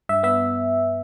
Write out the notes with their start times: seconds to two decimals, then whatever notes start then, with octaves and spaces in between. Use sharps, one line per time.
0.09 G2 E5
0.23 B3 E5